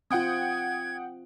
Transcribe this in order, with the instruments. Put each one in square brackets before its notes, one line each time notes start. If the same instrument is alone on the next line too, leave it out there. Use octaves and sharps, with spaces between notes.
[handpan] C4 F4 [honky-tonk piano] F#5 G5 D#6 [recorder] G#6